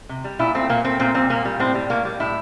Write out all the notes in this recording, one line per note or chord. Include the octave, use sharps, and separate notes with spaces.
C3
G3
A#2 E4
A3 C4
A#2 A#3
A3 C4
A#2 C4
G3 C4
A#2 A#3
G3
A2 C4
G3
A2 A#3
G3
A2 E4